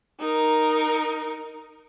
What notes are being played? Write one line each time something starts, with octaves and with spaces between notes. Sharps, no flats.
D#4 A#4